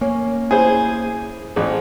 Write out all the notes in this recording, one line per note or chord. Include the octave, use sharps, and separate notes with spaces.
A#3 C#4
E4 G#4 C5 G#5
A1 A3 C4 G#4 B4